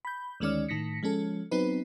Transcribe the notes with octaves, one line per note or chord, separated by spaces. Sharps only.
B5 G6
D2 D#3 G#3 C#4 D5 F6
A2 D#3 A#6 B6 C#7
F3 G#3 C#4 A4
F#3 B3 C4 D#4 B4